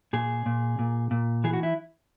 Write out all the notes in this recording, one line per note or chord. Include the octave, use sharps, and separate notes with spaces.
A#2 G#4
A#2
A#2
A#2
E3 G#4
F#4
E4